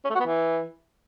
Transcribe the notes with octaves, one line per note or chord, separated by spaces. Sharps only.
C#4
A3
F#4
B3
E3